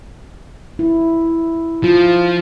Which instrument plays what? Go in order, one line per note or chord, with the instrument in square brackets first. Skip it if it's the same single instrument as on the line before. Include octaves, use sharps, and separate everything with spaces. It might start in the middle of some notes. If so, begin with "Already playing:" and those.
[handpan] E4
[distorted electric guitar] F3 [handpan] F4